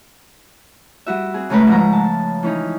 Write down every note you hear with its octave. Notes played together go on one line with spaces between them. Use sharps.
G3 F#4 E5
C4 G#4
C#3 G#3 A3 C#4 A#4 B4
G#2 F3 G#3 A#5
A5
E3 C#4 D#4